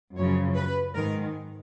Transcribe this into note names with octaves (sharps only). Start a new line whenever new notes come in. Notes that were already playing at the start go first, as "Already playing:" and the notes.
F#2 C#3 F3 C#5
B4
G#2 D#3 G#3 A#4